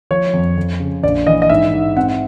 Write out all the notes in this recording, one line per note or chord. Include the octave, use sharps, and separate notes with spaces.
F3 C#5
F2
F2
C#3
A#1 D5
E3 D#5
D#5
G#2 E5
G#2
C4 F#5